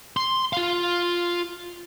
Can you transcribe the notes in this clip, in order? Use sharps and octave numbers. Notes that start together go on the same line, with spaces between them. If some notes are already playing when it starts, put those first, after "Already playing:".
C6
F4 F5